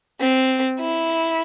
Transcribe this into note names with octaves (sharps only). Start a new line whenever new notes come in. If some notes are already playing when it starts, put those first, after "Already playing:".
C4
E4